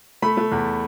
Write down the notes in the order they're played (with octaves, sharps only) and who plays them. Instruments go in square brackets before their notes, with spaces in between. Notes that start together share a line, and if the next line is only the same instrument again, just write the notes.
[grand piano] A3 B5
A3
E2